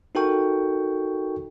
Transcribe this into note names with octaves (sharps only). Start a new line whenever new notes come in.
D#4 F#4 A4 A#4 G5 C#6